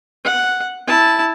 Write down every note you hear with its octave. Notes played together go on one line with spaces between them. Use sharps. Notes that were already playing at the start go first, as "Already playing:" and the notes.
F#5
E4 A5